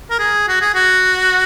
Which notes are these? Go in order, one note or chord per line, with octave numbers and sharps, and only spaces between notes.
A#4
G#4
F#4
G#4
F#4